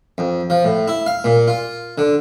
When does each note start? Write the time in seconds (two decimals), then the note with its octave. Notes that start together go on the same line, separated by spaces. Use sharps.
0.18 F2
0.50 F3
0.64 A2
0.88 E4
1.06 F5
1.24 A#2
1.48 F4
1.98 D3